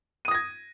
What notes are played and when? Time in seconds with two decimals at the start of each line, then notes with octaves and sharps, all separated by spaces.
0.25 D#7
0.28 D#6
0.31 A#6
0.34 G#6